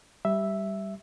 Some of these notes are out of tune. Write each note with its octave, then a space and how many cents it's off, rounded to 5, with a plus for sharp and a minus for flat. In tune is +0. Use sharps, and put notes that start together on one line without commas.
G3 +0 E5 +0